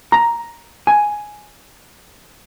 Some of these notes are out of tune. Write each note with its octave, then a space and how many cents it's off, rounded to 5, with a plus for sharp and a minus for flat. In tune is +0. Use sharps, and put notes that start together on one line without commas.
A#5 +5
G#5 +5